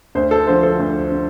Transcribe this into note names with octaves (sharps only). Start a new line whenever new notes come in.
D2 C5
A4
D3 F3 C5
A4
D2
D3